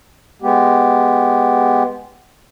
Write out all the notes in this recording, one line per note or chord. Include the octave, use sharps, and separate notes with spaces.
G#3 B3 G4